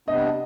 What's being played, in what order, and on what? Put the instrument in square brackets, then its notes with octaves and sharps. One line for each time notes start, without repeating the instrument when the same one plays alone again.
[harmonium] C3 G3 B3 D4 [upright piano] D#5